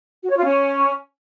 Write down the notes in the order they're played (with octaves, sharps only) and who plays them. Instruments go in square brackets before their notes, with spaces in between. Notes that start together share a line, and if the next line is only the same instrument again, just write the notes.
[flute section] F#4
C#5
F4
C#4